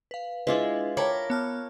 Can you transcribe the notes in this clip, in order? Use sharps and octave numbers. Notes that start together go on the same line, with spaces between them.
B4 F5
G#3 D4 E4 F4 B4 E5
A#4 C#5 G5 A5 B5 D6
B3 A5 F6